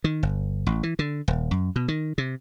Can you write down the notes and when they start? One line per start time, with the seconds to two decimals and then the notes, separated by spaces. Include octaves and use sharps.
0.04 D#3
0.23 G1
0.67 A1
0.83 E3
0.99 D3
1.28 D#1
1.51 F#2
1.76 B2
1.88 D#3
2.18 C3